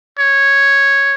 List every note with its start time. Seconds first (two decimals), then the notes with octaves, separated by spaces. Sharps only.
0.19 C#5